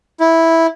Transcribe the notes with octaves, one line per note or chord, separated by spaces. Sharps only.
E4